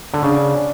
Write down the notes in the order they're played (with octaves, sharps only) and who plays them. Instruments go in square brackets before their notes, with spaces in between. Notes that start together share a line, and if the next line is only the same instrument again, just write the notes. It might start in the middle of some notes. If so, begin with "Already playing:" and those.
[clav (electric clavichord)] D3
[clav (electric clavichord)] C#3 [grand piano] D4